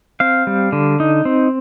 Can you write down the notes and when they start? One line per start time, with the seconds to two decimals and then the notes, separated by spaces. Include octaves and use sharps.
0.20 C4 F5
0.47 G3
0.72 D3
1.00 D#4
1.25 C4